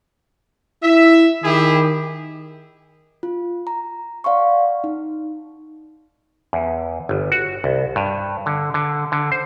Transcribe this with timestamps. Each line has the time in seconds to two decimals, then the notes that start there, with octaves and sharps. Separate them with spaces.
0.83 E4 E5
1.43 D#3 E4 G4 G#4
3.23 F4
3.67 A#5
4.24 D5 F5 F#5 C6 C#6
4.84 D#4
6.53 E2
7.09 G1
7.32 F#4
7.64 C2
7.96 G2
8.46 D3
8.74 D3
9.12 D3
9.32 C5